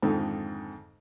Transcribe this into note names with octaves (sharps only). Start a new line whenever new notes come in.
F2 G#2 D3 D#3